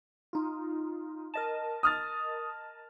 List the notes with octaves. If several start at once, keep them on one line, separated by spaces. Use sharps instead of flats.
D#4 F4
A#4 D#5 A5
D#6 F6 A6